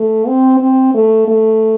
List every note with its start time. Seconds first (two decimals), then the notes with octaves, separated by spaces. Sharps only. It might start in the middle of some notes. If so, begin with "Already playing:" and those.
Already playing: A3
0.27 C4
0.61 C4
0.94 A3
1.28 A3